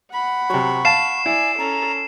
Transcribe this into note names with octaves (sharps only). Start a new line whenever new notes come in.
F#5 B5
C3 F#3 C#6
F5 A5 C7 E7
E4 D5 G#5
C#4 A4 A#5